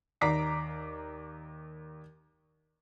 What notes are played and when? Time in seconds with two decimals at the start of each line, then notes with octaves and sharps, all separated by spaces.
0.21 D#2 D5 A#5 D6 B6 C7